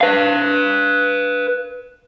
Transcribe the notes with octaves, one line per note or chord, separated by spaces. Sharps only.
B4 F5